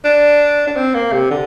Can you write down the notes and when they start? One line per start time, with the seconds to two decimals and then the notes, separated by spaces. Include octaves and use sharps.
0.04 D4
0.67 D4
0.77 C4
0.94 A#3
1.13 C3
1.30 D3